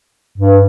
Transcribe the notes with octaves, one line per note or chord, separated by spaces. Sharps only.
G2